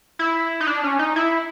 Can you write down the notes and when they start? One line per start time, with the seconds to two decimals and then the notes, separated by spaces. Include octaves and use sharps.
0.19 E4
0.61 D#4
0.67 D4
0.84 C#4
0.99 D#4
1.16 E4